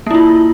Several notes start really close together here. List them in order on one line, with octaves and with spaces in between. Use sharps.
A#3 E4 F4